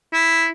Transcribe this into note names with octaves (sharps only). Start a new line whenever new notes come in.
E4